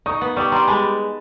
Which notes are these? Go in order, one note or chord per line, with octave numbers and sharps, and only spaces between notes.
D#4 C#6 D#6
B3
G3 C#6 D#6
G3 A#5 C6
G#3 A5 B5